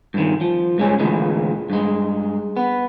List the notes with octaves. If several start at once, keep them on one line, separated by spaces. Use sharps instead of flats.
G2 D#3
F3
G2 G#3 C#4
D2 A#2 E3 G#3
G2 G#3
B3